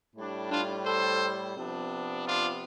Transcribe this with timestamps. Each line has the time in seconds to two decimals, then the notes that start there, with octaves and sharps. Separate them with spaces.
0.16 A2 G3 D4
0.51 D4 F4
0.86 A4 C5
1.57 C3 F3 B3 D4
2.27 D4 F4